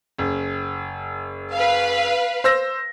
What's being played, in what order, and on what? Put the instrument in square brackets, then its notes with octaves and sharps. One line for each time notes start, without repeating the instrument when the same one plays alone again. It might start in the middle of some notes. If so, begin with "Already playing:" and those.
[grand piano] F#1
[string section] B4 F5
[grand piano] C5 E6 A#6